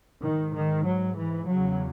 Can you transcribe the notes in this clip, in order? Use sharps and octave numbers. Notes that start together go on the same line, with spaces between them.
G#2 D#3
D#3
F#3
E3
C#3 F#3
E2